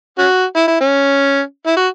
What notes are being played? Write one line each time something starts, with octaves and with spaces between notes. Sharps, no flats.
C#4 F#4
E4
E4
C#4
E4
F#4